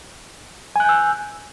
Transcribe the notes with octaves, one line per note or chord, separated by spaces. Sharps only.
G#5 E6 F#6 G6